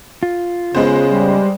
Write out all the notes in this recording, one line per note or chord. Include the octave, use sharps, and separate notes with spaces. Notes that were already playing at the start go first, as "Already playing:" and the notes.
F4
C#3 G#3 B3 C5
G3